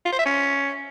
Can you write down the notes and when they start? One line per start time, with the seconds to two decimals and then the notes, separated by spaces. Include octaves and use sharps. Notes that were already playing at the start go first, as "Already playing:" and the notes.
0.06 F4
0.12 C5
0.19 E5
0.26 C#4